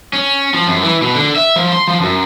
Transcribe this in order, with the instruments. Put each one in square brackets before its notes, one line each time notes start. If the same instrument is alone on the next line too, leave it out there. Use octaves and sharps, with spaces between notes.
[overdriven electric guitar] C#4
F3
F#2
E3
B2
D3
E5
F3
C6
F3
F#2